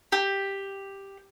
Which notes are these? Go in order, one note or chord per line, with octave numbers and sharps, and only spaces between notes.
G4